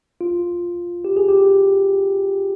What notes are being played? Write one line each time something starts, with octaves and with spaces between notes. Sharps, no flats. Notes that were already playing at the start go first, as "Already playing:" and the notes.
F4
G4
G#4
G4